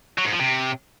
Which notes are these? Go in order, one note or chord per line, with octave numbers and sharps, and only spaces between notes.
F#3
G#2
F3
C3